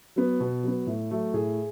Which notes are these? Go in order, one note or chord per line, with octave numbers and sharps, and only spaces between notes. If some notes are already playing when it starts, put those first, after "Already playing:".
F#3 B3
B2
F#3 B3
A2
F#3 A3
A2 G#4